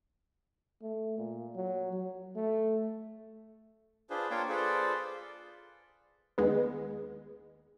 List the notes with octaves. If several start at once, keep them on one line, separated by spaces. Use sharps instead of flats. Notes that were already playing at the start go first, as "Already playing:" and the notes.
A3
A#2
F#3
F#3
A3
D4 F4 G#4 B4 C5
A#3 D4 F4 C5 C#5 G5
F4 G#4 A4 B4 C5 D5
D#2 G#3 B3